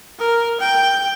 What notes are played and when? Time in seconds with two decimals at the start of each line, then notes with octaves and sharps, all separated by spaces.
0.19 A#4
0.60 G5